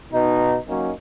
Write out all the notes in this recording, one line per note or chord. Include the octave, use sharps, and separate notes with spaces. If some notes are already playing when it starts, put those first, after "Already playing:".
B2 D#4
F#3 A#3 C#4 D#4